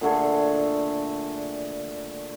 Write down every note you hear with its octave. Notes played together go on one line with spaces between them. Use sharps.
A#2 D3 A3 G#4